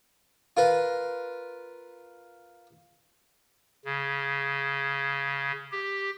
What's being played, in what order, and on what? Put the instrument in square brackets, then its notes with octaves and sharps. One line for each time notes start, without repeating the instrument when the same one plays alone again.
[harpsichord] F4 A#4 B4
[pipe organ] C#3
G4